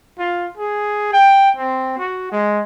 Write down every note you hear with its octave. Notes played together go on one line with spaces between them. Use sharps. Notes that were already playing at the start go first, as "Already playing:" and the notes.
F4
G#4
G5
C4
F#4
G#3